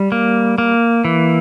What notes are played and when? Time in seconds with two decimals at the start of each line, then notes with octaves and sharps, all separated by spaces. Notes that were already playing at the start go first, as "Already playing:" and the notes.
Already playing: G3
0.12 A#3
0.58 A#3
1.05 E3